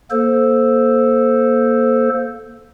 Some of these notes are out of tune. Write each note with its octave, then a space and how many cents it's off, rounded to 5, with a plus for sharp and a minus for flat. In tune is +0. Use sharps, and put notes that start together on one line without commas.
A#3 +10 A4 -5 C5 +0